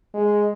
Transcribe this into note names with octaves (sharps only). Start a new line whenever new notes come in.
G#3